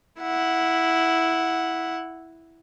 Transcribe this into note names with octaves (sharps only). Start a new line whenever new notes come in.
E4 F#5